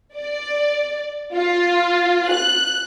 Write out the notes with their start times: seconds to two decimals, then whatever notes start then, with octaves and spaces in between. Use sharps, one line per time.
0.16 D5
1.36 F4
2.32 F#6